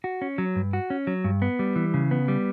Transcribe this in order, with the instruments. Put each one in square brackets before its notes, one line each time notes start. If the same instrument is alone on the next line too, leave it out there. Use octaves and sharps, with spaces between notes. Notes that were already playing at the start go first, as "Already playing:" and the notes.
[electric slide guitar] F#4
C#4
F#3
G2
F#4
C#4
F#3
G2
B3
G3
E3
C#3
B3
G3